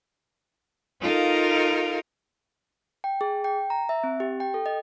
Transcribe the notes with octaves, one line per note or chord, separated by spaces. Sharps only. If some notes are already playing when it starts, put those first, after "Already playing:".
D#4 F4 A4 A#4 F5
G5
G#4
G5
A#5
E5
C4
G4
G5
A4
D#5